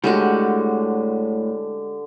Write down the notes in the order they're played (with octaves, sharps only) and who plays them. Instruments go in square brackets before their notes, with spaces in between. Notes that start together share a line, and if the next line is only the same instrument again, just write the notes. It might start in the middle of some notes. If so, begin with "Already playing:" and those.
[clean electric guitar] A2 [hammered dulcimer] D3 [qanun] G3 G#3 F#4